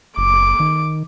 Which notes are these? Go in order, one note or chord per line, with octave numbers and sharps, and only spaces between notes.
F#1 D6
D#3